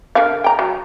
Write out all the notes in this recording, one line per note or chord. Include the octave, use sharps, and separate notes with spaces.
D3 A#4 F5
G5 A#5
F#3